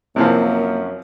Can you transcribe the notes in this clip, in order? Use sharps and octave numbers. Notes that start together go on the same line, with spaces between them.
F#2 C3 E3 F3 A#3